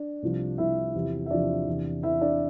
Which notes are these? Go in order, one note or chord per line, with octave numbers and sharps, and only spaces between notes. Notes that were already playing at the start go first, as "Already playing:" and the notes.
Already playing: D4
C2 C3 F3
C2 C3 F3 E4 E5
E2 C3 F3
E5
E2 C3 F3 D4 D5
E2 C3 E3
E2 C3 E3 E4 E5
D4 D5